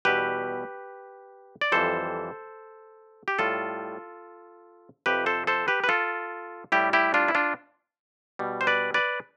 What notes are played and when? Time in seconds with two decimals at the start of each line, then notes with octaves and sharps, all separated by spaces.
0.05 E2 B2 G3 G4 B4
1.61 D5
1.72 F2 E3 G3 A4 C5
3.28 G4
3.39 A2 G3 F4 A4
5.06 F2 C3 F3 G4 B4
5.26 A4 C5
5.47 A4 C5
5.68 G4 B4
5.84 B4
5.89 F4 A4
6.72 A2 G3 E4 G4
6.93 E4 G4
7.14 D4 F4
7.28 E4
7.35 D4 F4
8.39 B2 G3
8.61 C5
8.67 B4 D5
8.94 B4 D5